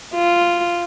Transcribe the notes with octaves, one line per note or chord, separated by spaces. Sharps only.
F4